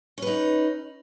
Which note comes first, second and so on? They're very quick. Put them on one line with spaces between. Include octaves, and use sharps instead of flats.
C#4 B4 D#4